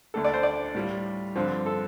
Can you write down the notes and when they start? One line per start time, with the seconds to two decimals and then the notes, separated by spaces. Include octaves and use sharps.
0.14 D2 D3 A3 D4 A4
0.24 D5
0.34 C5
0.43 D5
0.75 A2 G3 F4
1.36 G2 D3 F3 C4
1.66 A4